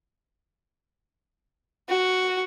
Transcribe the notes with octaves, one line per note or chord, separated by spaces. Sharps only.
F#4